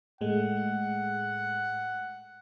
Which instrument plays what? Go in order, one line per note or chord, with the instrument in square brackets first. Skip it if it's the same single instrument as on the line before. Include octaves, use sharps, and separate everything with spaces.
[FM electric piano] A2 G#3 A3 [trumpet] F#5